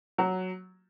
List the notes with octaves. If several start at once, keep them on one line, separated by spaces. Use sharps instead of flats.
F#3